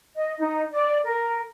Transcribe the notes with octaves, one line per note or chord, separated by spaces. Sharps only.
D#5
D#4
D5
A#4